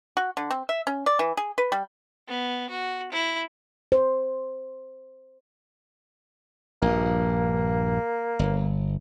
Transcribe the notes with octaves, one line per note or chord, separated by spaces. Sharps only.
F#4
D3
C4
E5
C#4
D5
E3
G#4
B4
G3
B3
F#4
E4
C5
A#1 G2 A#3
G1